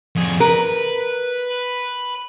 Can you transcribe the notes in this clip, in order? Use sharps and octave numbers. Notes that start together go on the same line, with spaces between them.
F2 G#4
A#4 B4